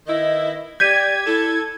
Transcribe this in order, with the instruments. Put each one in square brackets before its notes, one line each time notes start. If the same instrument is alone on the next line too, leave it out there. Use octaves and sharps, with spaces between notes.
[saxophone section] D#3 B3 E4 [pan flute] D#5
[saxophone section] G4 [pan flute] D5 [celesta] G6 B6 D#7 [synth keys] G#6
[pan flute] E4 [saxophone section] A4